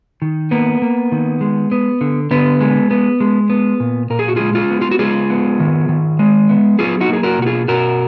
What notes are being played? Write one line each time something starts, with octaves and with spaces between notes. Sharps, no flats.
D#3
A#3 B3
A#3
D#3
G#3
B3
D3
D3 B3
G#3
B3
G#3
B3
A#2
A#2 A#4
G#4
F#4
G#3 F4 G#4
F4 G#4
B3
F4
F#4
G#3 F4 G#4
B3
D#3
D#3
G#3
B3
F#3 F4 G#4
D#4 F#4
A#3 G#4
F#4 A#4
B2 F#4
F4 G#4
B2 F#4 A#4